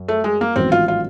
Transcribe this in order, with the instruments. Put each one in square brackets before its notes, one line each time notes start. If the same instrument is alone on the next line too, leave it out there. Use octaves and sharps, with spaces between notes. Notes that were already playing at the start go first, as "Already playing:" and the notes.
Already playing: [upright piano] F#2
[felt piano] A3
G#3
A#3
[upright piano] A1 G#2 D#3 F#3 B3 [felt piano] C4
[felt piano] F4
F4